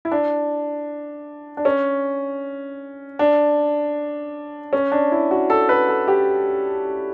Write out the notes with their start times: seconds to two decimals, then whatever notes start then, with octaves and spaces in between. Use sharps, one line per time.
0.05 E4
0.12 D4
1.57 D4
1.65 C#4
3.19 D4
4.73 C#4
4.92 D4
5.12 E4
5.31 F#4
5.50 A4
5.69 B4
5.88 A4
6.08 G4